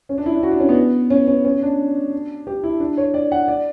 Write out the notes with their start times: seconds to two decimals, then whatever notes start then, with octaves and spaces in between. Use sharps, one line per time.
0.09 C#4
0.18 D4
0.26 E4
0.35 D4
0.43 F#4
0.51 D4
0.60 C#4
0.69 B3
1.10 C#4
1.27 C#4
1.45 C#4
1.62 D4
2.47 G4
2.63 E4
2.80 D4
2.97 C#5
3.14 D5
3.32 F#5
3.48 D5